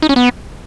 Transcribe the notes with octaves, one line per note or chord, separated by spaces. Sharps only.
D#4
C#4
B3